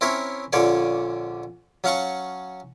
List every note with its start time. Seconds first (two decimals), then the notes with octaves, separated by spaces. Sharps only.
0.01 C4 C#4 E4 A#4 C#5 E5
0.53 A#1 A#2 D3 C#4 C#5 D5
1.84 F#3 C#4 F5 F#5 A5 C#6